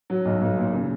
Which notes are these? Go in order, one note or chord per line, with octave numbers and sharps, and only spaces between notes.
F#3
B1
B1
A#2
C#3